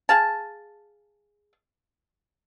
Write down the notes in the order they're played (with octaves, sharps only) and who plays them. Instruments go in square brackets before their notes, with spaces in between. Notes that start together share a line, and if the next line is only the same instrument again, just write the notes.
[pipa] G#4 F5 A5